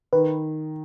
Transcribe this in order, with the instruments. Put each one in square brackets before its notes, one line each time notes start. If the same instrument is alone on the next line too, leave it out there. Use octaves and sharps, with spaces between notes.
[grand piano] D#3 [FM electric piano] B4